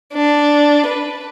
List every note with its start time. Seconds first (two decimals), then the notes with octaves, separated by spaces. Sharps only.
0.13 D4
0.86 B4